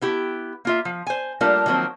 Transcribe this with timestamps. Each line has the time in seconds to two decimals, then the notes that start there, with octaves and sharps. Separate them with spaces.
0.02 B3 E4 G4
0.65 A#3 F4 E5
0.85 F3
1.07 C5 G#5
1.41 G3 A3 A#3 D4 F4 A#4
1.66 D#3 F3 F#3 A#3 C4